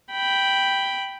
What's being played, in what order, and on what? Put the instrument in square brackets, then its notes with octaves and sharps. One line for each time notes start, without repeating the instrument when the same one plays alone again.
[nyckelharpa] G5 B5